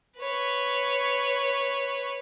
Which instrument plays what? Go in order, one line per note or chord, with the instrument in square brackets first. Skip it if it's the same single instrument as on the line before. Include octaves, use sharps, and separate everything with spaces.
[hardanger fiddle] B4 C#5